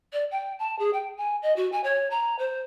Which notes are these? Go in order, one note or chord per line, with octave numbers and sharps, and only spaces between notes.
D5
G5
A5
G#4
G5
G#5
D#5
F#4
G#5
C#5
A#5
C5